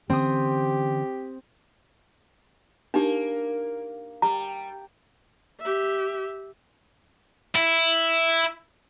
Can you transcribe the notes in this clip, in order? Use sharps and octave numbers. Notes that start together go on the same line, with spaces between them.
D3 E3 C4 C#4 G4 D#6
A#3 D4 D#4 G4
G3 A#5
G4 E5
E4